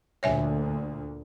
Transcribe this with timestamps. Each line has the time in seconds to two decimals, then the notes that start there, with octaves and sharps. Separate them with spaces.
0.23 D2 A#2 C#5 E5 G#5